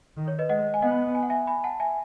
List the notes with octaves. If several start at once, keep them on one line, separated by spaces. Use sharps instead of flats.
D#3
C#5
B4 D#5
G#3 D#5 F#5
G#5
B3 D#5 F#5
G#5
F#5
E5 G#5
G#5 B5
F#5 A5
E5 G#5